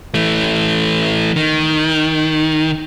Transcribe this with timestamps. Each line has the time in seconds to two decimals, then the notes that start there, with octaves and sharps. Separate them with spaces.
0.14 E3 A3
1.36 D#3